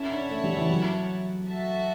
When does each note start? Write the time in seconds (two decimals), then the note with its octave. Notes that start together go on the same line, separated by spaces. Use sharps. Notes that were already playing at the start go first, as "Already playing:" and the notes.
Already playing: C#4 E4 A4 C#5 F#5 A5
0.12 D4
0.31 A3
0.44 G3
0.56 E3
0.69 F#3
1.48 F#4 A4 E5 A5